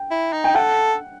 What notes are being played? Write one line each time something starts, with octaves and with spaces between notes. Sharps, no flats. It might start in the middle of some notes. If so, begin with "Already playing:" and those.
Already playing: G5
E4
D#4
G5
A4 F#5